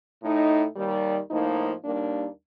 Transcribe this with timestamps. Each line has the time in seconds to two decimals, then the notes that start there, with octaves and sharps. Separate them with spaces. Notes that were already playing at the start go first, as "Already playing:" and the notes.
0.23 A2 A3 D#4
0.76 D#2 D#3 G3
1.30 A2 F3 A#3 D#4
1.85 D#2 D#3 G3 A#3 D4